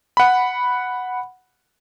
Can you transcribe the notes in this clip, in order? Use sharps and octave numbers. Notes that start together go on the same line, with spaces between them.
F#5 B5